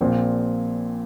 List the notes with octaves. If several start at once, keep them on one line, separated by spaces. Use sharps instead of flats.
A#1 A#2 F3 C4